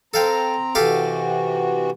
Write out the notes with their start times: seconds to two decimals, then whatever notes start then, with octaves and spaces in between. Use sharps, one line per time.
0.14 C4 A4 F5 G5 A#5
0.75 C3 E3 F#4 G4 A4 F5